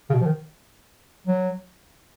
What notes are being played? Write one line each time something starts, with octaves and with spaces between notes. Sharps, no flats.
C#3
B2
F3
D#3
F#3